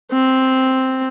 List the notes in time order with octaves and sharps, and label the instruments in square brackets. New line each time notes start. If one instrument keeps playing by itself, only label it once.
[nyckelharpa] C4